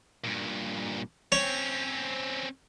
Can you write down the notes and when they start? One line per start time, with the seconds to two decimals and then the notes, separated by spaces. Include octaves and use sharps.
0.24 G2 A#2
1.32 C4 C#4 C#5